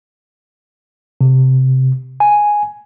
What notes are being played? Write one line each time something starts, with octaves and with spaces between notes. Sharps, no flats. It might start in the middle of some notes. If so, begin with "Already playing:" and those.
C3
G#5